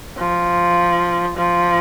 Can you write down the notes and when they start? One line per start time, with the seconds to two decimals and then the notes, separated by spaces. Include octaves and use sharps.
0.18 F3
1.38 F3